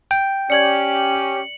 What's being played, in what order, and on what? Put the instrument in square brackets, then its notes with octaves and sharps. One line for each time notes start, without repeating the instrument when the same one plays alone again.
[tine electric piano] G5
[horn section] C#4 G4 [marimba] D5 G#6 [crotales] C#7 F#7